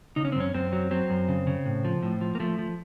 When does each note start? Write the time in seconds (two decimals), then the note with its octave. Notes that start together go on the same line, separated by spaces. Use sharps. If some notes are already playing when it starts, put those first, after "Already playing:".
0.16 C#3 D#4
0.25 C#4
0.32 C4
0.36 F#2 C#4
0.54 F#2 C4
0.73 F#3
0.91 F#3 C4
1.10 F#2
1.29 C#3
1.47 C#3
1.66 A2
1.85 F3
2.03 A2
2.21 F3
2.35 A#3
2.40 F3 A3
2.59 F3